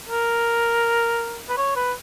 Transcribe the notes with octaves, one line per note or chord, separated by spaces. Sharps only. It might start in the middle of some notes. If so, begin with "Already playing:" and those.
A#4
B4
C#5
B4